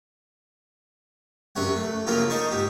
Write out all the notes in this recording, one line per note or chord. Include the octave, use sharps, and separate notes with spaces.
F#2 C3 C#5 F#5
A3
C#3 F3 F#3 A#3 C4 F4
D#4 C5 A5 C#6
G#2 G4